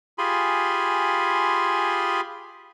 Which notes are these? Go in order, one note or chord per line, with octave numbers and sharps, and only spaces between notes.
F4 G4 G#4 G#5 B5 C6